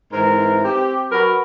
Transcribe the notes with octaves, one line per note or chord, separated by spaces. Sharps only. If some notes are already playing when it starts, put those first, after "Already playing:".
G#2 E3 C4 A#4
C4 G4
F#3 F#4 A#4 B4